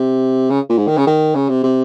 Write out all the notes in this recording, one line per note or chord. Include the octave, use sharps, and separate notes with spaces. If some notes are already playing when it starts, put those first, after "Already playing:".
Already playing: C3
C#3
A#2
G#2
D#3
C#3
D#3
C#3
C3
C3